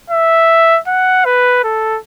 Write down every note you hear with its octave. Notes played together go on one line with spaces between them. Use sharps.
E5
F#5
B4
A4